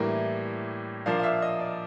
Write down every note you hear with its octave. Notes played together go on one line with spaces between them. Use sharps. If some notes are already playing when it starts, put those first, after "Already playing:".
Already playing: A2 E3 G3 A#3 D4
A#2 F3 A#3 D4 F5
F5
E5
D#5
D5